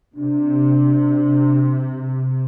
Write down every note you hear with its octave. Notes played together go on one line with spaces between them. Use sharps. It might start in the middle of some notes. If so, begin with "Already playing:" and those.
C3 D4